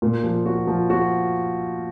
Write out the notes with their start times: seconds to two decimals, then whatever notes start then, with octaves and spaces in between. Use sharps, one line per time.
0.02 A#2
0.24 F3
0.46 F#4
0.67 F3
0.90 F#4